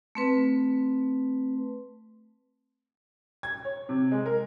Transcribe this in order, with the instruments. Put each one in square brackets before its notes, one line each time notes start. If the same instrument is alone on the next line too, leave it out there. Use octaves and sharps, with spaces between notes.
[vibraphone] A3 C4 B4
[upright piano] G#6
C#5
C3
G#3
A#4